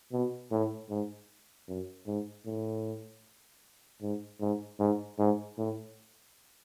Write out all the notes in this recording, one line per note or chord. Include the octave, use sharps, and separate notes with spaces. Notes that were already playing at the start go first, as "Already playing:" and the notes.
B2
A2
G#2
F#2
G#2
A2
G#2
G#2
G#2
G#2
A2